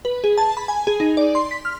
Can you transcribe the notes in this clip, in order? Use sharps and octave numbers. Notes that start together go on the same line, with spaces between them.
B4
G#4
A5
B5
G#5
G#4
D#4
D5
C6
B6
F6